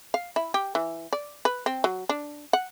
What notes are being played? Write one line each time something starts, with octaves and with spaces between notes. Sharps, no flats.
F5
E4
G4
E3
D5
B4
C4
F#3
D4
F#5